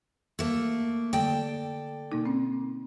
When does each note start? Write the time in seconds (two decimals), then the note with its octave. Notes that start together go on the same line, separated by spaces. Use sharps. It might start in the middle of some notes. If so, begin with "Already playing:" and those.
0.39 A3 A#3
1.13 D3 A#3 A4 D5 G5
2.12 B2 A#3 D#4
2.25 C4 C#4